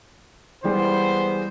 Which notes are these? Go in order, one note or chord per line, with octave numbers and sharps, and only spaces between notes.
E3 G3 G#3 B3 C5